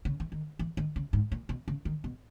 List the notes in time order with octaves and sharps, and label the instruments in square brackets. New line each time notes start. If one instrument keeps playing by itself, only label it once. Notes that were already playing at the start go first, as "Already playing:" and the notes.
[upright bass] C#3
E3
D#3
E3
D#3
C#3
G#2
A#2
B2
C#3
D#3
B2